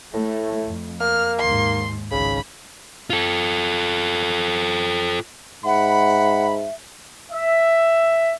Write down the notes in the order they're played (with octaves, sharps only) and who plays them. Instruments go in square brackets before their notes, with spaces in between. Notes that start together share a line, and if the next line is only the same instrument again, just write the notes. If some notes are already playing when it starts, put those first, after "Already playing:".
[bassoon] A2 [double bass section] A3
[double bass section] F2
[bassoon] A#3 [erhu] F6
[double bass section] D#2 G#2 [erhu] C6
[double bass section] G#1 C#2 G#2 [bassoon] C#3 [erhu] B5
[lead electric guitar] F4 A4
[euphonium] G#2 [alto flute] E5 [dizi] F#5 [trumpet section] B5
[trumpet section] E5